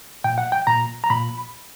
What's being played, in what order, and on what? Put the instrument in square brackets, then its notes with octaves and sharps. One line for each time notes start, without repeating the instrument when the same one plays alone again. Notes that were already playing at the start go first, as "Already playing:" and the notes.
[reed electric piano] A#2 G5
F#5
G5
A#2 A#5
A#5
A#2 B5